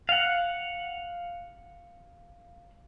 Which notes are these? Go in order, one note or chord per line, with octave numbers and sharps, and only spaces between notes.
F5 F#5